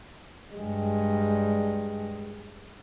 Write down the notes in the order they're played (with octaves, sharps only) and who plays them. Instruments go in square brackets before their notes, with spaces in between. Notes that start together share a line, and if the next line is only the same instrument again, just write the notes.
[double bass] G2 G#3